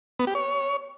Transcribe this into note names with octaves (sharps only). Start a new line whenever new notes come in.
B3
G4
C#5